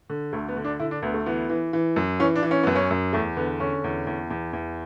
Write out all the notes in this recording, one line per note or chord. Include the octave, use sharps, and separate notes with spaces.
D3
D2 A3
B3
D3
D4
D3 E4
D4
D2 B3
A3
E3 B3
E3
E3
F#2
E3 C#4
D4
E3
C#4
F#2 B3
C#4
F#2
E2 A3
D3 B3
D3 C#4
E2
E2
E2
E2